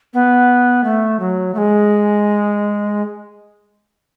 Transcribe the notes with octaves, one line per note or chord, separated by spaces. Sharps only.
B3
A3
F#3
A3
G#3